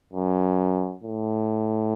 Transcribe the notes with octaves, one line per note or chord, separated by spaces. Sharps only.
F#2
A2